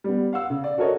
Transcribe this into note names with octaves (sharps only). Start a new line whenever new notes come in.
G3 B3
F5 F#5 E6
C#3
D5
F#4 A4 A#4 C#5 D#5